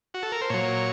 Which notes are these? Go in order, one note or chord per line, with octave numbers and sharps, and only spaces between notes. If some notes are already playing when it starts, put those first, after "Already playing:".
F#4
A4
A#4
C5
A#2 F#3 C#5